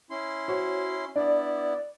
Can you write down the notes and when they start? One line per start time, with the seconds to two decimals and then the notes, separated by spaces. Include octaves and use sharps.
0.11 C#4 E4 C6
0.48 F#4 C5 C#5
1.16 B3 D4 E4 D5